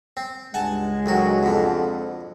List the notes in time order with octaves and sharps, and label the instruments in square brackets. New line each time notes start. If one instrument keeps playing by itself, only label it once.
[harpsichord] C4
[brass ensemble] C#2 G#3 [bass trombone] G2 [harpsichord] F#5 G#5 A5
[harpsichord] D2 D#3 F#4 [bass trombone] F#3
[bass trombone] F2 [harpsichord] B2 D3